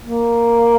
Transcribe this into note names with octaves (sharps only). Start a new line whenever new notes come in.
A#3